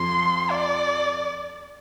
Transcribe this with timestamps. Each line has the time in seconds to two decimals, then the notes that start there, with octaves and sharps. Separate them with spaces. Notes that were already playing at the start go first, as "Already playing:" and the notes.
Already playing: F2 F3 C6
0.51 D5